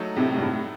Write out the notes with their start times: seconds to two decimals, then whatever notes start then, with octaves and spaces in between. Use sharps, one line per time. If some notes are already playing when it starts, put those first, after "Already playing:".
Already playing: F#3 A3 D#4
0.16 A2 C3
0.37 G2
0.41 A2